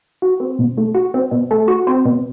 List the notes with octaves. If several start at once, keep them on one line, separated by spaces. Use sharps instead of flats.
F#4
C4
B2
A3
F#4
C4
B2
A3
F#4
C4
B2